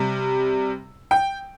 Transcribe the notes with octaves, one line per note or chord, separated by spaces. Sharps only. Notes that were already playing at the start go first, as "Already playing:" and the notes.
Already playing: C3 G3
G5